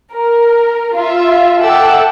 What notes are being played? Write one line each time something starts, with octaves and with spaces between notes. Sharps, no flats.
A#4
F4 E5
A4 E5 F#5 G5 D6 E6